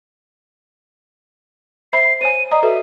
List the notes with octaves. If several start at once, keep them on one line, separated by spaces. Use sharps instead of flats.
C5 E5 B5 C7
C5 C#5 G#5 D#7
D5 D#5 A#5 D#6
F#4 A4 B4 E5